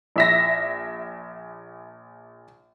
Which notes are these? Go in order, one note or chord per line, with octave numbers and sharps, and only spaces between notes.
A#1 E5 A#6